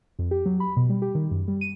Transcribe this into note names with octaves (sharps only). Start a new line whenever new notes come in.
F2
G4
F#3
B5
B2
G3
G4
D#3
F#2
G3
D#7